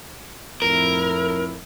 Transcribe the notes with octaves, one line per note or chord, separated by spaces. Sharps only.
F2 A2 E4 A#4